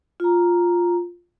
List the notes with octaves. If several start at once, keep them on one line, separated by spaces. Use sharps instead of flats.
F4 A#5